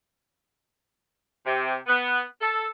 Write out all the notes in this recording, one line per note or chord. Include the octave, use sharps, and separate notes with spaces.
C3
B3
A4